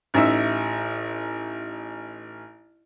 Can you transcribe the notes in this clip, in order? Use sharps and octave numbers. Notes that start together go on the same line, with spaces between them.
A1 D#4 E5 E6